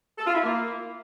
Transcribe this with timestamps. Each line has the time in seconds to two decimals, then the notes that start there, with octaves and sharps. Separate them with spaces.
0.18 A4
0.27 F4
0.35 E4
0.44 A#3